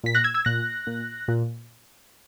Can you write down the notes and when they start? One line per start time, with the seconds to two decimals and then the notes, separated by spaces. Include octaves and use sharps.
0.04 A#2 B6
0.14 F#6 A#6
0.24 E6 G#6
0.34 E6 G#6
0.45 A#2 F#6 A#6
0.87 A#2
1.28 A#2